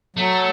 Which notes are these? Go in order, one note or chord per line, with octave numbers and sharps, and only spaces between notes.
F#3 A3